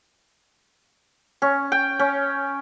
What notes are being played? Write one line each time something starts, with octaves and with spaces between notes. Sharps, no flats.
C#4
G5
C#4